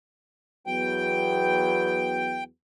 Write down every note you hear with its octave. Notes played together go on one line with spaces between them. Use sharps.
E2 F#3 B3 G5